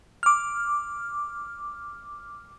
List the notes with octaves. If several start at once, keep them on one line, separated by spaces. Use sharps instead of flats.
D6 F6